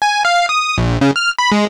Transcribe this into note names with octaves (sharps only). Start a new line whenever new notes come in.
G#5
F5
D#6
A#1
C#3
F6
B5
G#3